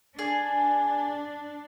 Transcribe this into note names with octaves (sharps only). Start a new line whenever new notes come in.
D4 G#4